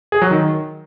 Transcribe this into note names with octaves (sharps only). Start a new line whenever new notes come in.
G#4
F#3
D#3